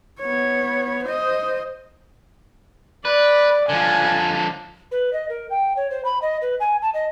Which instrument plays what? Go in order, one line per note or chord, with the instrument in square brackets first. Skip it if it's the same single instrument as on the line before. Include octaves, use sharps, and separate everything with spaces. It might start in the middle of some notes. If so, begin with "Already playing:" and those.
[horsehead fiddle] B3 C#5
C5 D#5
[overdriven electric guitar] B4 [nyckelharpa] D5
[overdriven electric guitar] D3 F3 [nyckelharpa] G#5
[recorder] B4
D#5
A#4
G5
C#5
C5
B5
D#5
B4
G#5
A5
D#5